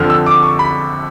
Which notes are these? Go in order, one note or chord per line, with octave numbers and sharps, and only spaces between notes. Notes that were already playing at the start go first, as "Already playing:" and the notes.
Already playing: F2 D3 F3 F6
E6
D6
C#6
B5